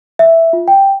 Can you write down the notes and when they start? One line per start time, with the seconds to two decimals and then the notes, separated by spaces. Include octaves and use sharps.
0.19 E5
0.53 F4
0.68 G5